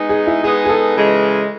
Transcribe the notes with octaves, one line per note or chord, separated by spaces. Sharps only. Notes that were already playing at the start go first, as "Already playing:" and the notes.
Already playing: G#3 B3 D#4
G#4
E4
G#3 B3 D#4 G#4
G#4
A4
C#3 E3 G#3